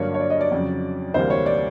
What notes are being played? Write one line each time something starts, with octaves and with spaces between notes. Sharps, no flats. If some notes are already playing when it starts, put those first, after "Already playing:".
Already playing: G2 D3 F#3 A#3 D4 C#5
C#5
D5
D#5
D5
F2 C#3 F#3
D2 C3 E3 G3 A#3 C5
C#5
D5